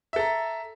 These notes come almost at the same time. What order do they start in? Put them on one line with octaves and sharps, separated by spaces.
E5 A4 A#5